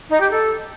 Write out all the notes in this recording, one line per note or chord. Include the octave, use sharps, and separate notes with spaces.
D#4
G4
A4